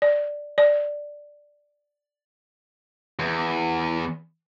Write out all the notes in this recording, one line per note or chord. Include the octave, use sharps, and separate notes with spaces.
D5
D5
E2